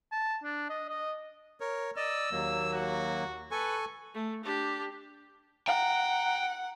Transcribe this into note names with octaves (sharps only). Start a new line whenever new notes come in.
A5
D4
D#5
D#5
A#4 C#5
D5 D#5 E6
D#2 F#3 A#3
F#4
A4 B4 G#5 C#6
A3
D4 G4
F#5 G5 A#5